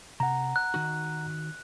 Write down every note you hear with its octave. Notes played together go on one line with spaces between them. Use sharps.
C3 F#5 A#5
F#6
D#3 D#4 F#4